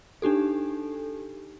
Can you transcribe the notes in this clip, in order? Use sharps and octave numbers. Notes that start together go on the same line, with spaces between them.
D4 D#4 G4 A4